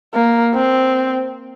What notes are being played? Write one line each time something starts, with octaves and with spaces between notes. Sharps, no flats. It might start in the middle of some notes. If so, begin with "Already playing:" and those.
A#3
C4